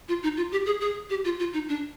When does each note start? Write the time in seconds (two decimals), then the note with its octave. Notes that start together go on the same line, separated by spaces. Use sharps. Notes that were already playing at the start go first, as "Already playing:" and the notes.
0.08 F4
0.23 D#4
0.37 F4
0.52 G4
0.66 G#4
0.81 G#4
1.10 G4
1.24 F4
1.39 F4
1.54 D#4
1.69 D4